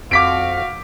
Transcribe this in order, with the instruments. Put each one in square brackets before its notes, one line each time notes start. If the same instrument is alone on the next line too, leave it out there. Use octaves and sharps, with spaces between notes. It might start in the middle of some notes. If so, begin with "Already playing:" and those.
[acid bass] F2 [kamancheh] F#4 F5 [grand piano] D6 B6 D7